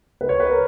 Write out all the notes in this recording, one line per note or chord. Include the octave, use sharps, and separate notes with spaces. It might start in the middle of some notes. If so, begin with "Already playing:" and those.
B4
C#5
B4
A#4